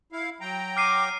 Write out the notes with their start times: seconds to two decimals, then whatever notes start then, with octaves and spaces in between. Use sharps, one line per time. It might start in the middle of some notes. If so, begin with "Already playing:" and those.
0.12 E4 F5
0.41 F#3 G5 A#5
0.77 D6 F6 C7 D#7